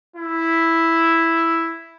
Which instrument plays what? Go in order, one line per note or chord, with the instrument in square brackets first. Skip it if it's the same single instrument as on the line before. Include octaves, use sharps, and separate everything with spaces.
[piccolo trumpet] E4